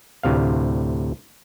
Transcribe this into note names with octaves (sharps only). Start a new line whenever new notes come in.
D2 A2 C3 F5